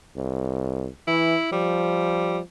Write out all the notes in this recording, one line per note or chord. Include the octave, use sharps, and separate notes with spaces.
C2
E3 E4
F3 G3